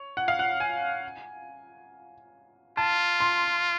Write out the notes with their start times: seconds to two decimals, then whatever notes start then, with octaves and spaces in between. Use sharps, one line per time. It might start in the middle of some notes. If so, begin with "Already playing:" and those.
Already playing: C#5
0.17 F#5
0.28 F5
0.39 F#5
0.60 G#5
2.77 F4 A5
3.20 C6